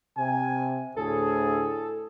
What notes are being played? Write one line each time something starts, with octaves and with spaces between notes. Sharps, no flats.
C3 G#5
D2 A2 G#4 A4